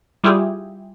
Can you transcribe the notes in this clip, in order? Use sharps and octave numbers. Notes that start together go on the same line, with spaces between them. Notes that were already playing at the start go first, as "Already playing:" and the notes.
G3 E4 F4 G4 G#4